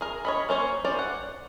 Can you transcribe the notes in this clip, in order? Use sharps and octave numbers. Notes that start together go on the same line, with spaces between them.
G#4 A#4
C#5 D#5 B5
A#3 C#4 C5 C#5
C#4 C5 D5
F#5